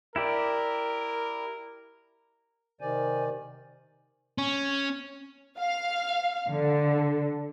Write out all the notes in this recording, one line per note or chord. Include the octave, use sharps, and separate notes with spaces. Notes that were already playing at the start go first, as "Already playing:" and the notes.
E4 G4 A#4 D5
C3 D#3 C5 D5 G#5
C#4
F5
D3